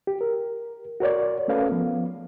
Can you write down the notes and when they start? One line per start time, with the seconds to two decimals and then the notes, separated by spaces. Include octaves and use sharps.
0.07 G4
0.21 A#4
1.00 F#4 A#4 C#5 D5
1.48 A3 C#4 A4 B4 F5
1.69 F3 B3